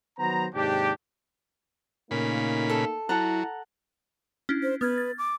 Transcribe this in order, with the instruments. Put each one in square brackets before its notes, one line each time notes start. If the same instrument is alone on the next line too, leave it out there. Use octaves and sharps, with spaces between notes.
[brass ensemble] D#3 F#3 B3 C5 A#5
D#2 G#2 C3 D4 G4
[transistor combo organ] A#2 C#3 B5 [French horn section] A3 A#3 D#4
[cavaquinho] A4
[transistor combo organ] F#3 [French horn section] E4 [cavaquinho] A4 F#5 A#5
[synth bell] C#4 D4 E4
[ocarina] C5
[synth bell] B3 F6 G#6 [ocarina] B4
[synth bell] A6
[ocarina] D6